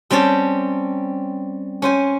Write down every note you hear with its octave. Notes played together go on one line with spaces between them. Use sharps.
G3 C4 C#4 G4 A5
C#4 C5 G#5